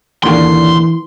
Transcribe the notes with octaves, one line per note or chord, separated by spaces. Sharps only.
D#2 A#2 D3 E3 C6